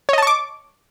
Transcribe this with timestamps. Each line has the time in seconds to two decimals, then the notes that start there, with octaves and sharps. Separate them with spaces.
0.09 C#5
0.13 D#5
0.18 A5
0.23 C#6
0.27 D6